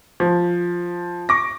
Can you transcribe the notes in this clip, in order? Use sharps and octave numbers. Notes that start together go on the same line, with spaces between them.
F3
C#6 D6 A#6